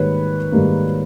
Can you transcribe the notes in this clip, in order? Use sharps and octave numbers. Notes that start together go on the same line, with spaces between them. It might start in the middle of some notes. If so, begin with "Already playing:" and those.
Already playing: G#2 D#3 G3 A#3 B4 C#5
G#2 D#3 G3 A#3